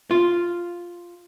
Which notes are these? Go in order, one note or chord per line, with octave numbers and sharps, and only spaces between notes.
F4